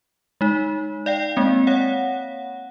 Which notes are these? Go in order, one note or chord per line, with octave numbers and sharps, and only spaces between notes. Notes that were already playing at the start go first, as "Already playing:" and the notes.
G#3 D#4
D5 F5 G5
G#3 A#3 C4
C#5 F5 F#5